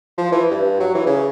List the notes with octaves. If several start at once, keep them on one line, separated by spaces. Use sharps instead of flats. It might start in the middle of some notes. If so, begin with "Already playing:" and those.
F3
E3
G2
F#3
E3
C#3